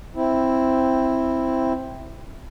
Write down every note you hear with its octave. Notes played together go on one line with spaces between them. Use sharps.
C4 E4